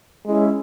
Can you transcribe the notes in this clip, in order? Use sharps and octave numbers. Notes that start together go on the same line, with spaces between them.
G#3 C#4 E4 G#4